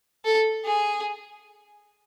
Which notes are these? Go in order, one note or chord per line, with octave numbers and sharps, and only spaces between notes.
A4
G#4